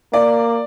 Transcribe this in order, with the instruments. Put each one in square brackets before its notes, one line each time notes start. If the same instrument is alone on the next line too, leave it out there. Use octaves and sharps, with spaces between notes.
[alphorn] A#3 [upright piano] D5